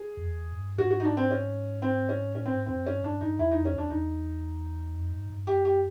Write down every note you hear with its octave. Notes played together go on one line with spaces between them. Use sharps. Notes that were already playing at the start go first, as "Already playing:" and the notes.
Already playing: G#4
F2
E2
G2
G#2 F#4
F#4
D#4
D4
C4
C#4
C4
C#4
A2 C#4
C4
G#2
F#2 C4
G2 C#4
G2 D4
G2 D#4
E2 E4
F2 D#4
C#4
E2 D4
E2 D#4
F2
G2
G2
F#2 G4
G4